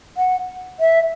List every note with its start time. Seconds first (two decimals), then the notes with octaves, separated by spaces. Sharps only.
0.17 F#5
0.80 E5